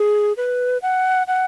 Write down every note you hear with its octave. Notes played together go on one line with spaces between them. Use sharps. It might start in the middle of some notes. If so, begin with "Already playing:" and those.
Already playing: G#4
B4
F#5
F#5